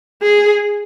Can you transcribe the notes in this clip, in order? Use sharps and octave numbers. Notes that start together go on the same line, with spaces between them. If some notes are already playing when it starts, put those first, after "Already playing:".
G#4